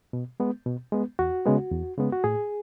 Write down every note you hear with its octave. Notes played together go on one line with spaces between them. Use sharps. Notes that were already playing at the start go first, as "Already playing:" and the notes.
B2
G#3 B3
B2
G#3 B3
E2 F#4
C#3 G#3 B3
E2
C#3 G#3 B3
F#4
A2 G#4